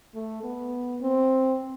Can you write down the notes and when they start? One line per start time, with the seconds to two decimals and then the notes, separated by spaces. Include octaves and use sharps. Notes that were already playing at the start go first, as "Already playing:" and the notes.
0.15 A3
0.44 B3
1.01 C4